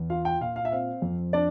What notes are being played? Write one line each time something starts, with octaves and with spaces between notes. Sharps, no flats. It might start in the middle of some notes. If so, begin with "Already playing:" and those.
Already playing: E2
F4 F5
G5
A#2 F5
F5
E5
C4 F5
F2
D4 D5